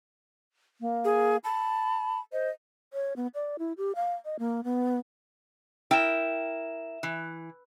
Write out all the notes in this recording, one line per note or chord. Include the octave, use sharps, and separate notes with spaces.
A#3
G#4
A5 B5
C5 D#5
C#5
B3
D5
E4
G4
F5
D#5
A#3
B3
E4 A#4 E5 G5 E7
E3